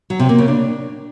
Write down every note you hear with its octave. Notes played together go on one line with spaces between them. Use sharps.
F#3
C3
A#3
C#3
D4